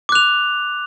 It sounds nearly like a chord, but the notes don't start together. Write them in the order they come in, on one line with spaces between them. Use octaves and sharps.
D6 F#6 F7